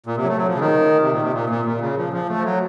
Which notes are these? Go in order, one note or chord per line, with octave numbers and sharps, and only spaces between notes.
A#2
C3
F#3
A3
F#3
F3
C#3
D#3
C3
A#2
C3
A#2
A#2
A#2
C#3
F3
F3
A3
F3
F#3